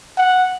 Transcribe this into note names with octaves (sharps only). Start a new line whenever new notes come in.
F#5